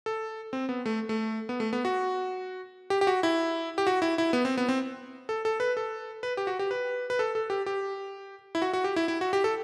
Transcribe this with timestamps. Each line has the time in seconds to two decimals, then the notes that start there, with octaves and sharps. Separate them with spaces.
0.06 A4
0.53 C4
0.69 B3
0.86 A3
1.09 A3
1.49 B3
1.60 A3
1.73 B3
1.85 F#4
2.90 G4
3.01 G4
3.07 F#4
3.23 E4
3.78 G4
3.87 F#4
4.02 E4
4.18 E4
4.33 B3
4.45 C4
4.58 B3
4.69 C4
5.29 A4
5.45 A4
5.60 B4
5.77 A4
6.23 B4
6.37 G4
6.47 F#4
6.59 G4
6.71 B4
7.10 B4
7.19 A4
7.35 A4
7.50 G4
7.66 G4
8.55 E4
8.62 F#4
8.73 F#4
8.84 G4
8.96 E4
9.08 E4
9.21 F#4
9.33 G4
9.44 A4